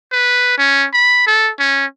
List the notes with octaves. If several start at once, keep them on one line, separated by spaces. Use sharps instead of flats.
B4
C#4
B5
A4
C#4